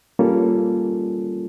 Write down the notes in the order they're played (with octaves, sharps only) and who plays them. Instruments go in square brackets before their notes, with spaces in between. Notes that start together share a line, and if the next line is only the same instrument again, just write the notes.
[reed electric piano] G3 A#3 C#4 F4 A4